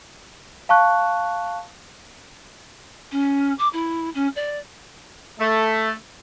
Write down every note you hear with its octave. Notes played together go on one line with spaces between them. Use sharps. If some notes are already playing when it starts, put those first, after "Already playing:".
F5 A5 C#6 F#6
C#4
D6
E4
C#4
D5
A3